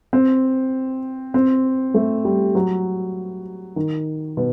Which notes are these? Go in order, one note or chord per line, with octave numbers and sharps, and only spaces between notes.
C4
C4
A3
G3
F#3
D#3
B2